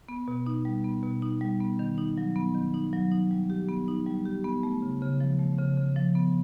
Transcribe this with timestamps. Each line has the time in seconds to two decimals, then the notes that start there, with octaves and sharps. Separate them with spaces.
0.09 B3
0.28 B2
0.46 D#4
0.65 G3
0.84 B3
1.03 B2
1.22 D#4
1.41 G3
1.60 B3
1.79 D#3
1.98 D#4
2.18 F#3
2.36 B3
2.55 D#3
2.74 D#4
2.93 F#3
3.12 D#4
3.31 G3
3.50 G4
3.69 B3
3.88 D#4
4.06 G3
4.26 G4
4.44 B3
4.63 A3
4.82 C#3
5.02 C#3
5.20 F3
5.39 A3
5.58 C#3
5.77 C#3
5.96 F3
6.15 B3